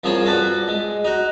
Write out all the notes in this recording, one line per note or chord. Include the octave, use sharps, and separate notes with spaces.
C2 F3 A#3 G#4 C5 C#5
F#4 A4 B4 D5
G#3
D#4 F#4